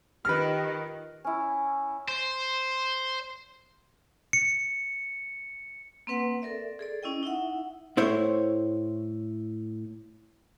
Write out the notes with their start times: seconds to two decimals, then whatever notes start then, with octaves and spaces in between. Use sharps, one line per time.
0.25 D#3 F4 G4 B4 F6
1.24 C#4 E4
2.08 C5
4.33 C#7
6.07 A#3 C4 B4 F#5
6.42 A4 A#4 D5 E5
6.79 G#4 A4 D5
7.03 C#4 E4 D#5 G5
7.23 D#4 E4 E5 F#5
7.97 A2 E4 C5 C#5